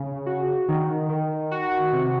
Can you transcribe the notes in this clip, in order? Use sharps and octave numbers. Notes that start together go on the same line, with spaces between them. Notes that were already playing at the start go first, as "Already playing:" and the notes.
Already playing: C#3
F#4
D#3
D#3
F#4
C3